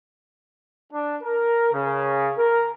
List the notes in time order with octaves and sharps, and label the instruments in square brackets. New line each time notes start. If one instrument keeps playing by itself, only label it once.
[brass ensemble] D4
A#4
C#3
A#4